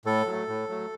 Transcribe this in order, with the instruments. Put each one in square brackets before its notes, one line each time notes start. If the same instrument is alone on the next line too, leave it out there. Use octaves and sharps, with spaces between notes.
[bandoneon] A2 A4
F#3 A3
A2
F#3 A3